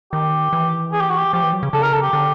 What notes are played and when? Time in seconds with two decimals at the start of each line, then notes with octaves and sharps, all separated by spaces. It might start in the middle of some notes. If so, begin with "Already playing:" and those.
0.13 D#3 G4
0.53 E3
0.93 G#4
1.01 G4
1.10 F#4
1.17 G4
1.33 F3 G4
1.43 E3
1.53 F#3
1.63 C#3
1.73 C#3 A4
1.82 A#4
1.93 A4
2.02 G4
2.13 D3